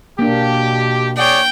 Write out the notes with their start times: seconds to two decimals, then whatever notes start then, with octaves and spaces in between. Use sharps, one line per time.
0.19 B2 A#3 D4 G4
1.18 G#4 C#5 D5 G5